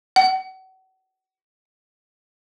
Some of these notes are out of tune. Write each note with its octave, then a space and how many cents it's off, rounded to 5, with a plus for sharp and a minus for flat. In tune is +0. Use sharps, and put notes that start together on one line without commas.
F#5 +35